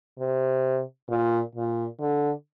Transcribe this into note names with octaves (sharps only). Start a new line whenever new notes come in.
C3
A#2
A#2
D3